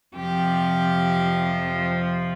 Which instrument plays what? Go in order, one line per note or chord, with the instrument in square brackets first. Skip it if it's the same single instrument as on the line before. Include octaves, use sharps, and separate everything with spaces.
[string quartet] F2 C3 F3 G4